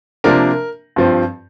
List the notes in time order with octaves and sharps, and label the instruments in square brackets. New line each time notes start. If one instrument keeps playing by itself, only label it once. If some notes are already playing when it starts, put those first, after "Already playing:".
[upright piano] C3 F3 A#3 D4 A#4
G2 F3 C4